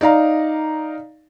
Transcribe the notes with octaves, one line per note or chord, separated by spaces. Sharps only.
D#4 D5 F5 A#5